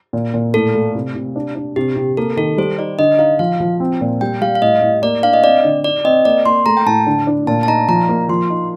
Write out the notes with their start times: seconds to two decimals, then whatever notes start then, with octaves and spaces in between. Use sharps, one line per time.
0.13 A#2
0.34 A#2
0.54 A2 A4
0.74 A3
0.95 C3
1.15 C3
1.36 D4
1.55 D4
1.76 C3 G4
1.96 C3
2.17 A#3 A4
2.37 D#3 A4
2.57 G3 C5
2.79 D#4 D5
2.99 D3 D#5
3.19 D#4 F5
3.39 F3 F5
3.60 F3
3.80 C4
4.01 A#2
4.21 G3 G5
4.41 G3 F5
4.55 F5
4.62 A2 D#5
4.82 A2
5.02 A#3 D5
5.23 D4 F5
5.33 D#5
5.44 C4 D5
5.64 D3
5.84 D#4 D5
6.04 C4 D#5
6.25 A#3 D5
6.46 A#3 C6
6.66 A3 A#5
6.77 G5
6.86 A2 A5
7.06 D3
7.27 D4
7.47 A#2 A5
7.63 A5
7.68 D#4 A#5
7.88 F3 A#5
8.09 A#3
8.29 F3 C6
8.50 D#4